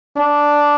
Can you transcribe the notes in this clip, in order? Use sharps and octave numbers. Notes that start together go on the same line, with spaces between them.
D4